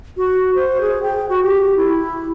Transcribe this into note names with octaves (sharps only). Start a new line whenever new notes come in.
F#4
C5
G#4
G5
F#4
G4
E4